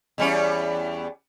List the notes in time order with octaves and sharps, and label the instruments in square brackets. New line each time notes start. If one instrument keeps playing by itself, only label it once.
[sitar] E2 G3 C#4